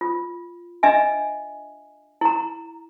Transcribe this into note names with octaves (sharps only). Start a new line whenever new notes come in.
F4
D4 D#5 E5 G#5
E4 A#5